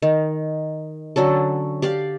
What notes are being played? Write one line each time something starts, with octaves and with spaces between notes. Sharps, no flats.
D#3
D3 F#3 C#4 A4
G4 D5 F5